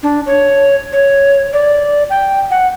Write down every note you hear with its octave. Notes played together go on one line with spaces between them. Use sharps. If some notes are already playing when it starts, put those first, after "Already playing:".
D4
C#5
C#5
D5
G5
F#5